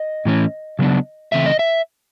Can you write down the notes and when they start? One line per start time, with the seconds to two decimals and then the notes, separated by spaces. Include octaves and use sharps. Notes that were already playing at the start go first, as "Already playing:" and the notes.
Already playing: D#5
0.25 A2 E3 A3 C#4
0.79 C#3 F#3 B3 D4
1.32 C#3 E3 A3 C4 E5
1.46 D#5
1.59 E5